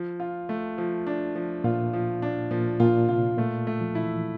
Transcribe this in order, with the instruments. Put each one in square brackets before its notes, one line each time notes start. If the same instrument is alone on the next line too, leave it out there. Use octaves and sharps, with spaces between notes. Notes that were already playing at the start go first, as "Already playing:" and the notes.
Already playing: [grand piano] F3
F4
A3
F3
D4
F3
[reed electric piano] A#2 [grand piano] F4
[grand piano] F3
D4
[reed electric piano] A#2 [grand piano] F3
[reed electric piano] A#2 [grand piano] F4
[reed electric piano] C3 [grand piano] F4
[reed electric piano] A#2 [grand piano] A3
[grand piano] A3
[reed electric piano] F3
[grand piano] E4
[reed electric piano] E3